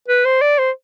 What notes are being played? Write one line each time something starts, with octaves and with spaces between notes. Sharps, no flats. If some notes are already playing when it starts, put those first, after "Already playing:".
B4
C5
D5
C5